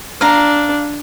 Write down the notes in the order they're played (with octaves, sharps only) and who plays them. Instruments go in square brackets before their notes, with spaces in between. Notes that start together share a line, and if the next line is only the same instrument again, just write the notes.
[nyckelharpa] D4 [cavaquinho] F5 A#5